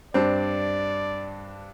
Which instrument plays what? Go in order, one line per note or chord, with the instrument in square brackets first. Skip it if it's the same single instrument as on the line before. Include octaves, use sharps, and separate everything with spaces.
[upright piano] G2 D4 [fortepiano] C4 [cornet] D5